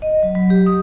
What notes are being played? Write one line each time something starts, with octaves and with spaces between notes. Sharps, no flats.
D#5
F#3
F#3
G4
D#6